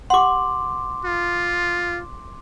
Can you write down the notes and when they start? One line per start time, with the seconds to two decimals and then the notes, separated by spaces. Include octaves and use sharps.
0.10 G4 F#5 C6 D6
1.05 F4